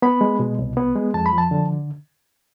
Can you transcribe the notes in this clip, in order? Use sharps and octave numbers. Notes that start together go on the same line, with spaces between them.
B3 B5
G#3
B2
C2
B3
G#3
F2 A5
B5
F3
A5
D3